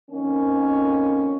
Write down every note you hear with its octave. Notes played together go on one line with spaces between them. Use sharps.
F2 D#3 A#3 C#4